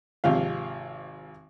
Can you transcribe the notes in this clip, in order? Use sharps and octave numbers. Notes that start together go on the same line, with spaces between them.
G#1 C3 F3 F5